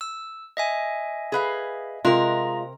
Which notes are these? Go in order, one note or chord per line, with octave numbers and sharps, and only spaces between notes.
E6
D#5 E5 G#5
G#4 B4 F5
C3 G#3 F4 A#4 D#5 A#5